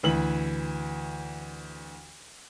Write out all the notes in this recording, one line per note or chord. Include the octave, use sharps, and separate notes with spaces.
D2 E3 F#7